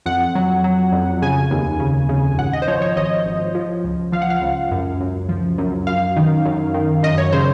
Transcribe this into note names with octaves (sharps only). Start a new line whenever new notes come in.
F2 F#5
F#3
F#3
F2
C#3 G#5
D#2
C#3
C#3
G#1 F#5
D#5
C5
F3 C#5
C#5
G#1 D#5
G#1
F3
C#2
F3 F5
F#5
F5
C#2
F#2
F#2
F3
F#2
F#2 F5
D#3
F#2
D#3
F#2 D#5
C#5
C#3 C5